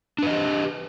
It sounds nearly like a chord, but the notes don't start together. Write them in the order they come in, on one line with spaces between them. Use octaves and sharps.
D4 B4 D#5 G4